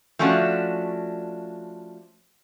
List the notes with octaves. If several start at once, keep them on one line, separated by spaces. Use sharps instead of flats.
F3 A3 C#4 D4 F#4